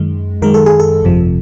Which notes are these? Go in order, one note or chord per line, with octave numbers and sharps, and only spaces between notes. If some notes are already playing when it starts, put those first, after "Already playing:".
Already playing: F#2 D#3 G#3
F#2 D#3 G#3 A#4
A4
G#4
A4
G1 F2 C3 F3